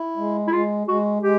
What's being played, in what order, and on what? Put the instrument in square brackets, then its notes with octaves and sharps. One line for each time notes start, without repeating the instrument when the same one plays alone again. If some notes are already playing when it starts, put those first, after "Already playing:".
Already playing: [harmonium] E4
G#3
[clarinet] E4
[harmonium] G#3 [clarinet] F4
[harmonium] G#3 [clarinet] F#4
[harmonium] G#3 [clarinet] G4